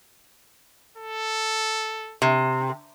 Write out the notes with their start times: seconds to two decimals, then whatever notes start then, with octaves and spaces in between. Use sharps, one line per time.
0.97 A4
2.22 C3